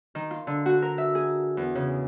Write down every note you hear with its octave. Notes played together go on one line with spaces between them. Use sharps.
D#3
F4
D3
F#4
A#4
E5
G#4
E2
C#3